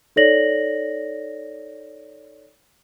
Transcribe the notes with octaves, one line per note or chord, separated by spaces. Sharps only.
D#4 A4 C#5 D5 A#6 F#7